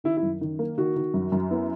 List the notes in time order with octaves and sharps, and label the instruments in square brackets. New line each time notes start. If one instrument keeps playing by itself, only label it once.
[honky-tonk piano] D#3 [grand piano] E4
[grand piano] E4
[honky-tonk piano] F#2
D#3
A#3
[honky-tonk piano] D#3 [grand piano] F#4
[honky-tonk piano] D#3
F#2
F#2
[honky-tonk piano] B3 [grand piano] E4